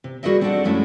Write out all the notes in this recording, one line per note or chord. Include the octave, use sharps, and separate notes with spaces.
C3
G3 F#4 G#4 A#4 D#5 E5
C4 D4 D#4 F#4 A4 F#5
F#2 F3 G#3 A3 C#4 E4